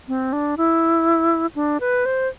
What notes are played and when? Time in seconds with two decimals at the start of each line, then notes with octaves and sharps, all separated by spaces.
0.08 C4
0.33 D4
0.57 E4
1.55 D4
1.80 B4
2.06 C5